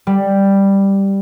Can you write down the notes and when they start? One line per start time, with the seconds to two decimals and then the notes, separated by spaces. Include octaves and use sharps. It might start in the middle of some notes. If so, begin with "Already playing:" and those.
0.07 G3